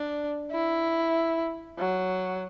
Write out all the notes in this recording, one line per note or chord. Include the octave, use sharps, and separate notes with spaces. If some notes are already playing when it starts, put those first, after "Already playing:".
Already playing: D4
E4
F#3